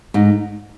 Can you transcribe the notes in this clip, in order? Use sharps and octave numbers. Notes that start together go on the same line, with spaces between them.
G#2 D#4